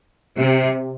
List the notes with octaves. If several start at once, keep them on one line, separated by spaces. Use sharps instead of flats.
C3